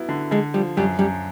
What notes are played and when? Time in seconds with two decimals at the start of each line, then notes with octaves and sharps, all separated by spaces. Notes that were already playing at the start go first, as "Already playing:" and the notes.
Already playing: F#3 B3 E4
0.09 D3
0.31 D3 G#3
0.54 F3 G3
0.77 F#2 G3
0.99 F#2 G3